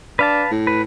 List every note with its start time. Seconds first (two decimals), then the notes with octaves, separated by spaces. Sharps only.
0.19 D4 B4 F5 A5
0.51 A2
0.67 B4